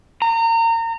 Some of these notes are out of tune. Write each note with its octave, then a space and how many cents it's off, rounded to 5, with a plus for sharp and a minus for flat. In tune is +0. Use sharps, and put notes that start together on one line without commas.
A#5 -30